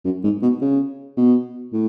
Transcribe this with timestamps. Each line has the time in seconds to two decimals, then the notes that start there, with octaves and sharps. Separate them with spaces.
0.05 F#2
0.24 G#2
0.42 B2
0.62 C#3
1.17 B2
1.73 A2